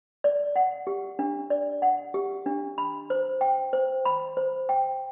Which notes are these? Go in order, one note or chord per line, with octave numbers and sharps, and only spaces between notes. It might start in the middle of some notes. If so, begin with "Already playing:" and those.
D5
F#5
G4
D4
D5
F#5
G4
D4
B5
C5
G5
C5
B5
C5
G5